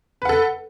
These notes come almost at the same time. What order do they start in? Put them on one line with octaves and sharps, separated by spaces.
B4 F#5 A4